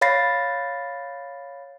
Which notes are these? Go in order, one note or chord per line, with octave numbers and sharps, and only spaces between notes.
C#5 F5 B5 A6 A#6 C7